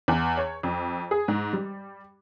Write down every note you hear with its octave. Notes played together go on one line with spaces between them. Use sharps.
E2
C#5
F2
G#4
G#2
G3